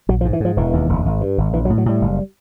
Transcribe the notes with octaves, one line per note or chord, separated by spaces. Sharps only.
A#1 F#3
F3
G#2
E3
G#2 F3
E1 E3
D#2
E1
G#1
G2
G#1
A#1 E3
F#3
A2
F#3
A2 G3
F#1